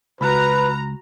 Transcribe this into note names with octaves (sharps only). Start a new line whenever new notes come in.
C#2 F#4 B4 A#5 B5 F6 F#6